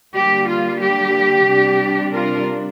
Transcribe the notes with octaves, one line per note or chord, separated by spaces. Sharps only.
D3 G3 A#3 G4
F4
G4
C3 G3 D4
F4 A#4